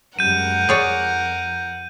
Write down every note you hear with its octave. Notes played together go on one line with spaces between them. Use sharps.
F#2 G3 G#3 A#4 F#5 G6 D#7
F2 G#4 C#5 D5